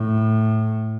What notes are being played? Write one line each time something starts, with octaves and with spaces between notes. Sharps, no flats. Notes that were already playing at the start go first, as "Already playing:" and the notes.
Already playing: A2